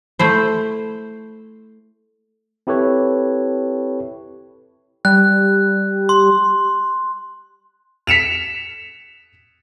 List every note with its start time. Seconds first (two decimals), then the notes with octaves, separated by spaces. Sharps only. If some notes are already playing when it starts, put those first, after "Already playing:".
0.19 A3 E4 C5
2.67 C4 E4 G4 A4 B4 C#5
5.05 G3 F#6
6.09 C6
8.07 B6 C#7 E7 F7